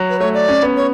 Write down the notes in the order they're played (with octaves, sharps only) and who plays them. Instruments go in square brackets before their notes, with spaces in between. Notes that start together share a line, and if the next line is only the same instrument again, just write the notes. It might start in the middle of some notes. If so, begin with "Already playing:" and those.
Already playing: [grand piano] F#3
[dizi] B4
[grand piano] A3 [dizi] C#5
[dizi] D5
[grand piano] C#4
B3
[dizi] C#5